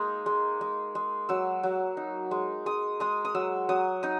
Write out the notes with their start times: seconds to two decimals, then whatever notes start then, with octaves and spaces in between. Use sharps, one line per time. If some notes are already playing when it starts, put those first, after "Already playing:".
Already playing: G#3 A#3 D#4 A#5
0.26 G#3
0.61 G#3
0.95 G#3
1.29 F#3 E6
1.63 F#3
1.97 D#4
2.31 G#3
2.66 G#3 D#6
3.00 G#3 D#6
3.25 D#6
3.35 F#3 E6
3.69 F#3 D#6
4.03 D#4 D#6